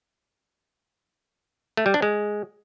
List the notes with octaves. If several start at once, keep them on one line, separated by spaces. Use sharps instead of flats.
A3
G3
D4
G#3